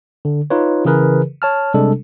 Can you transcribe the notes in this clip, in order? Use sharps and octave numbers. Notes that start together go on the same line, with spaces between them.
D3
D#4 F4 B4 C#5
C#3 E3 G#4 A#4 B4
C#5 A5 F6
C3 G3 G#3 D4 A4